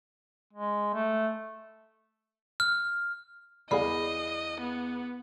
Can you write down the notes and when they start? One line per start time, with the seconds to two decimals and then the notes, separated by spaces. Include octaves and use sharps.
0.53 G#3
0.94 A3
2.60 F6
3.71 E2 G#4 D5 D#5 F5 B5
4.60 B3